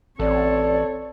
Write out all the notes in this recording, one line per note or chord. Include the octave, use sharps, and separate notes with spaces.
A1 C4 A4 C#5 D5